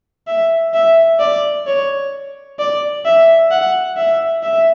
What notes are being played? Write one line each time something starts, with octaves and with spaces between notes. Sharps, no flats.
E5
E5
D5
C#5
D5
E5
F#5
E5
E5